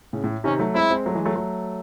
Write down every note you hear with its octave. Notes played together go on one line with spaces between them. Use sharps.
A2 C#3
A2
C3 D#3 C#4
F#3 A3
G#3 C4 E4
G#3 C4
F#3 A3
E3 G#3
F#3 A3
F#3 A3